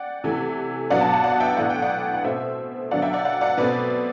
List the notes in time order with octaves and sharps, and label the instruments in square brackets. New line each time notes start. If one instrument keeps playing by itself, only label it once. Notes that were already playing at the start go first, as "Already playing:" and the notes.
Already playing: [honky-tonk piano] D5 F#5 G5
C3 E3 A3
B2 F#3 B3 D4 D5 F#5
F#5 A5
F#5 A5
D5 F#5
E5 G5
A2 E3 B3 D4 F#5
G5
D5 F#5
F#5
B2 A3 C4 C5 E5
D3 F#3 B3 D4 D5 F#5
E5 G5
D5 F#5
D5 F#5
D5 F#5
B2 A3 C4 B4 D5